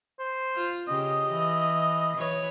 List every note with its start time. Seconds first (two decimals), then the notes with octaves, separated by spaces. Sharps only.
0.19 C5
0.56 F4
0.88 C#3 G4 D#5
1.31 E3
2.16 E3 B4 C#5